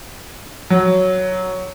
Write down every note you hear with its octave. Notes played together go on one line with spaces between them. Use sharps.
F#3